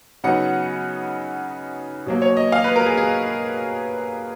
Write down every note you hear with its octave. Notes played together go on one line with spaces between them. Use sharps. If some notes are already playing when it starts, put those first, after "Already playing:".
C#3 F#3 B3 D#4 F#5
B2 F#3 A#3
C#5
D#5
F5
B4
A#4
G#4
G#4